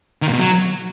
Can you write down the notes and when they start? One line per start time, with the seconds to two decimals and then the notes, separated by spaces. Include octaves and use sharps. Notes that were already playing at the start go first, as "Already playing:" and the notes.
0.22 D#3
0.28 A#2
0.34 B2
0.39 F#3